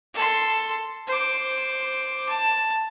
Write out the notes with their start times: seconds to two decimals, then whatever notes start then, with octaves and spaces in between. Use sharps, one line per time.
0.14 A4 C6
1.08 C5 D6
2.29 A5